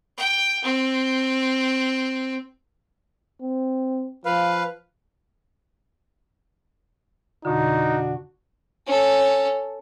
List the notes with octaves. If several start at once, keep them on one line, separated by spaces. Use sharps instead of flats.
G5
C4
C4
F3 B4 F5
F2 B2 D3 D4 D#4 F#4
C#4 A4